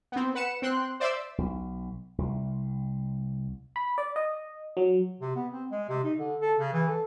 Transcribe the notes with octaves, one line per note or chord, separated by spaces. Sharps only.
B3 C4
B4 F#5 C#7 E7
C4 G5 C6 F#6
C5 D5 E5 C6 D6 E6
B1
C2
B5
D5
D#5
F#3
C3
B3
C4
G#3
C3
D#4
D3
A4
C#3
E3
A4